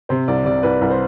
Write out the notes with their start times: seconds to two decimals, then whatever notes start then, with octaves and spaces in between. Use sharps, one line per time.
0.09 C3 C5
0.28 C2 D5
0.45 C3 D5
0.63 C2 B4
0.81 C2
0.90 C5